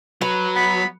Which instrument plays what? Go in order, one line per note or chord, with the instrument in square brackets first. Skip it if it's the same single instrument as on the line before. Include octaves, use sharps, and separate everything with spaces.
[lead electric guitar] F#3 [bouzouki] B4
[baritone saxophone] B3 [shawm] B5